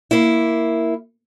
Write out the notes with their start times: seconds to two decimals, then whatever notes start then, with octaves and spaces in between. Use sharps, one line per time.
0.11 A#3 E4